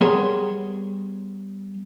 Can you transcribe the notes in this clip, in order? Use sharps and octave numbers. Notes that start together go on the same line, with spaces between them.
G3 B3 G#4 A#4 C#5 C6